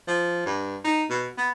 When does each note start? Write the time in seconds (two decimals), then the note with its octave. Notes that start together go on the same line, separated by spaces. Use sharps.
0.08 F3
0.46 G2
0.84 D#4
1.10 B2
1.38 B3